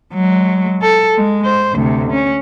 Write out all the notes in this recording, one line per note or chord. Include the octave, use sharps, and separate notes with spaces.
F#3 G#3
A4
G#3
C5
D2 C3
C#4